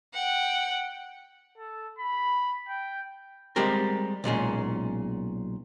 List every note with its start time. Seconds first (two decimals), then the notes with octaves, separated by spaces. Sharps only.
0.14 F#5 G5
1.58 A4
1.98 B5
2.68 G5
3.56 G3 G#3 C4 G4 A#4
4.24 B1 A#2 G#3 C#4